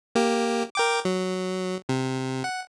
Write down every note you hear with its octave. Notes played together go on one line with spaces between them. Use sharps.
A#3 G4
A#4 G5 D6
F#3
C3
F#5